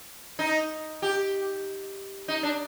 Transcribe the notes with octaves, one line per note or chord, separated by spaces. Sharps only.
D#4
G4
D#4
D4